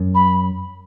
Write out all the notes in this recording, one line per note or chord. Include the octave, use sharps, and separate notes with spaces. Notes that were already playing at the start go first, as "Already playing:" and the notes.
Already playing: F#2
B5